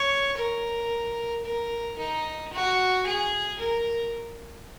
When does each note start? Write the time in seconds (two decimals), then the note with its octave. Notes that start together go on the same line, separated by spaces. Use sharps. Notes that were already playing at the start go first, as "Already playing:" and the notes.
Already playing: C#5
0.37 A#4
1.44 A#4
1.98 D#4
2.52 F#4
3.06 G#4
3.59 A#4